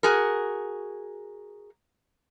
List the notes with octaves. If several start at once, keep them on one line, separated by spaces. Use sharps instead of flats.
F#4 G#4 A#4